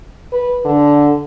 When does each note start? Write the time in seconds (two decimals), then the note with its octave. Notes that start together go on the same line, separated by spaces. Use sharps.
0.33 B4
0.65 D3